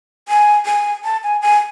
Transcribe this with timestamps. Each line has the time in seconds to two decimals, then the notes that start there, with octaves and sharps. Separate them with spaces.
0.28 G#5
0.66 G#5
1.04 A5
1.23 G#5
1.42 G#5